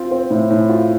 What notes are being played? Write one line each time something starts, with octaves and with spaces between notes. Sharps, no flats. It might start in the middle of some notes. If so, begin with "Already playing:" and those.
Already playing: C4 F4
C4
A2
A2
F4